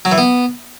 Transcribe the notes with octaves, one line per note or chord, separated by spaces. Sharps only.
F#3
E3
B3